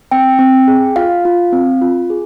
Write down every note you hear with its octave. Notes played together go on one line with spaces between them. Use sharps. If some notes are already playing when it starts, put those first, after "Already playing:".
C4 G5
C4
G#4
F4 F5
F4
C4
F4
G#4